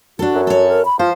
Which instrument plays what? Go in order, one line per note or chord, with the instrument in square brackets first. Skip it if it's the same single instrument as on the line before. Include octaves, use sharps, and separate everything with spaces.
[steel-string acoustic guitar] D4 A4 [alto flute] F#4
[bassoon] F#2
[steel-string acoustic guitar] A4 C#5
[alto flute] A#4
B5
[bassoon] F3 [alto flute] F4 [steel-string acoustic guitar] C5